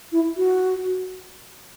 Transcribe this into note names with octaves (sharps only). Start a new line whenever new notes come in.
E4
F#4